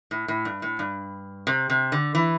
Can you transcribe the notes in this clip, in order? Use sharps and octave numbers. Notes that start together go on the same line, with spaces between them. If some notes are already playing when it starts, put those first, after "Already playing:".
A2
A2
G2
A2
G2
C3
C3
D3
E3